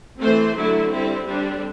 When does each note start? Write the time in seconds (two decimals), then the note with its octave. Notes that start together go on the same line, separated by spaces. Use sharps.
0.19 E3 A3 C4 C5
0.55 D3 F#3 A3 E4
0.90 D3 G3 C4 E4
1.25 D3 G3 C4 D4